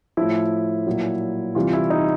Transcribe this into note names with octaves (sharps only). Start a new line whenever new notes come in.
A2 F3 E4
A#2 F#3
C3 E3 G3 F4
E4
D#4